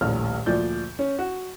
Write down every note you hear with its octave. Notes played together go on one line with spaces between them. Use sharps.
D#1 A#1 A2 F6
D2 A#2 F3 D5 G6
C#4
F#4